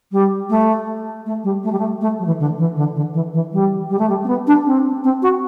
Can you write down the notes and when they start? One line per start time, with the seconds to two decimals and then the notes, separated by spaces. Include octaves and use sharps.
0.12 G3
0.49 A3
1.26 A3
1.44 G3
1.63 A3
1.72 G3
1.79 A3
2.01 A3
2.19 F#3
2.26 E3
2.39 D3
2.58 E3
2.76 D3
2.95 D3
3.14 E3
3.33 E3
3.53 G3
3.89 G3
3.99 A3
4.09 G3
4.24 C4
4.27 B3
4.47 D4
4.66 C4
5.04 C4
5.22 F#4